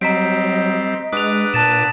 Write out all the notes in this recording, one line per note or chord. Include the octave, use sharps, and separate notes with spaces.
F#3 G3 C4 D#5 A#5 B6 D7
G#3 D4 B4 F#5 D#6 F7
A#2 A5 A6 E7